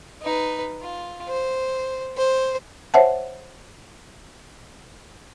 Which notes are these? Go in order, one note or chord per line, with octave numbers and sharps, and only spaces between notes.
D#4 B4
F4
C5
C5
C5 C#5 E5 F#5 A5